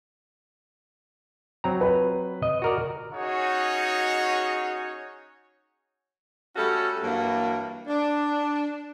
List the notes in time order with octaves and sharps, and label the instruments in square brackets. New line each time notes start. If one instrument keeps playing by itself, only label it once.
[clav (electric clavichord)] F#3 C4 A#5
[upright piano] B4
[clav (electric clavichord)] D#5
F#4 A#4 D5
[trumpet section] C#4 D#4 F#4 G#4 C#5 D#5
[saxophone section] G3 A3 C#4 F#4 A4
G2 E3 F#3 A#3
D4